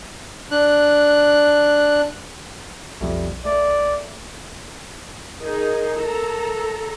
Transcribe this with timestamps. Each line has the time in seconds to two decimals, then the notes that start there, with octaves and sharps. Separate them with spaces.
0.51 D4 F#6
3.01 B1 F2 G3 A3
3.45 A3 D5
5.42 D#4 G#4 A#4
5.98 A4 A#5